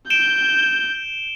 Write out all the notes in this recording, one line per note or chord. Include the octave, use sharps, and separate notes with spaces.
G6 D7 E7 G7